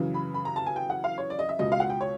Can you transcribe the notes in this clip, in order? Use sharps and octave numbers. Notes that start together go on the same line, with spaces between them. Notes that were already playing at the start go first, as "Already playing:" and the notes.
Already playing: F#2 C#3 E3
B5
B5
A#5
A5
G#5
G5
F#5
F5
C#5
D5
D#5
E5
C#2 B2 D#5
F5
F#5
G5
C#5